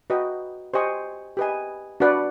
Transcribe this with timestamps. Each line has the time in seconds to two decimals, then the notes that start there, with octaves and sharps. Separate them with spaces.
0.10 F#4 B4 D#5 G5
0.74 G4 C5 D#5 G#5 C#6
1.37 G4 B4 D#5 G#5
2.00 D4 F#4 B4 D5 F#5